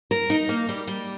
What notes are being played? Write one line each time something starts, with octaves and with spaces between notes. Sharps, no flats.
A#4
D#4
A#3
G3
G3